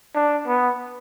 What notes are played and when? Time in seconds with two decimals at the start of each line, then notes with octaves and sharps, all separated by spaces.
0.15 D4
0.47 B3